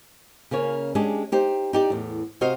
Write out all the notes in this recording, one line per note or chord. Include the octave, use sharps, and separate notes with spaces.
C#3 A#3 C#4 C#5
G#3 C#4 D4 G4 G#4
D#4 G4 C5
D#4 G4 D5
E2 A2
C3 F#4 C5 D#5 F5